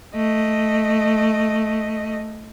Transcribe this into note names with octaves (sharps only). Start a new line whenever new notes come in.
A3 D#5